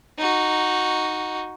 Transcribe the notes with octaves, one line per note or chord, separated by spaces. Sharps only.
D#4 F#4